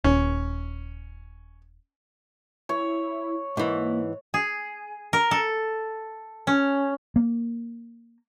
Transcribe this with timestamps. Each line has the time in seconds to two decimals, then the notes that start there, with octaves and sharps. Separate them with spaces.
0.04 D#1 C#4
2.69 E4 C#5
3.57 G#2 E3 A#3
4.34 G#4
5.13 A#4
5.31 A4
6.47 C#4
7.16 A#3